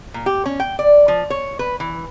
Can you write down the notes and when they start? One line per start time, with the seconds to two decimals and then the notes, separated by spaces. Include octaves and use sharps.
0.14 A#2
0.26 G4
0.46 C#4
0.60 G5
0.79 D5
1.08 F3
1.30 C#5
1.59 B4
1.80 E3